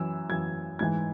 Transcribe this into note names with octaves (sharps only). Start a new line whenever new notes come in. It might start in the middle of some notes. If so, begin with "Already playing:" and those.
Already playing: F#2 E3 E6
F#2 E3 G#6
G#2 E3 G#6